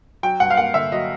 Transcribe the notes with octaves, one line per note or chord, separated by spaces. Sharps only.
F#3 G5
G2 F#5
F5
A#3 F#5
D3 E5
F#3 D#5